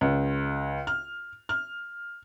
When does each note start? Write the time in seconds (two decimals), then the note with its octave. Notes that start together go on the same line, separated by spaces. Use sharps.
0.01 C#2
0.87 F6
1.49 F6